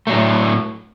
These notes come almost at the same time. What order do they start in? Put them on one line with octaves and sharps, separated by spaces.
A3 F#3 A2